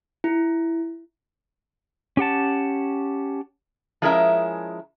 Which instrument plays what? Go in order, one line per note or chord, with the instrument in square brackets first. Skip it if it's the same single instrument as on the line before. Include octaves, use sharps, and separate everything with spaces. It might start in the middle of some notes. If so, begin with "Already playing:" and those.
[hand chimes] E4
[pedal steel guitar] C#4 G4 F#5 A5
[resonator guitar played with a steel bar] F3 G#3 C#4 E4 A#4 E5